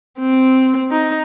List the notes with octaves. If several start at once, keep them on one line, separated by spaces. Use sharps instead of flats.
C4
D#4